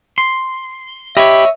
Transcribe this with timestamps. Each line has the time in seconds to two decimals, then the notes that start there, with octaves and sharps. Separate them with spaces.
0.18 C6
1.17 G4 C#5 D#5 E5 B5